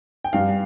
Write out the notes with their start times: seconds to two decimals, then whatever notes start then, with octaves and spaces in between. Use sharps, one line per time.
0.24 G5
0.33 G2 F5